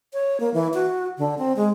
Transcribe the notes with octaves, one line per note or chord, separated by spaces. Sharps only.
C#5
A#3
E3
F#4
D3
C4
G#3